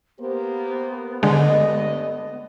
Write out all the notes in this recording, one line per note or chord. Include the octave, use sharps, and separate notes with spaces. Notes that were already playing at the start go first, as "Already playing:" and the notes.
A#3 B3 G4 C5
G2 D3 G#3 A3 D#5